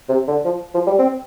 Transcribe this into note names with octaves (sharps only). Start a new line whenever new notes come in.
C3
D3
F3
F3
G3
C4